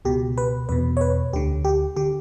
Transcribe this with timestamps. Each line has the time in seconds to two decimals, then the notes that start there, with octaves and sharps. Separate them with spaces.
0.05 C#2 B2 G4
0.38 B4
0.69 E2 B2 B4
0.97 C#5
1.01 B4
1.33 D2 D3 G4
1.65 G4
1.96 D3 G4